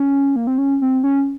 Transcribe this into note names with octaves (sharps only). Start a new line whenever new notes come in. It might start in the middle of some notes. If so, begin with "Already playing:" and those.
Already playing: C#4
A#3
C4
C#4
C4
C#4